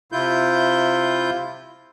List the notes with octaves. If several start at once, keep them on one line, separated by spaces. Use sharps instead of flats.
C3 E4 F4 G6